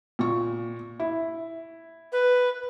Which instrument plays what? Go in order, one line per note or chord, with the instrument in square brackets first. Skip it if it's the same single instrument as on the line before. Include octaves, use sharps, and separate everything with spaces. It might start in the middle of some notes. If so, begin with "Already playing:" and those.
[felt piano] A#2 C#6
E4
[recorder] B4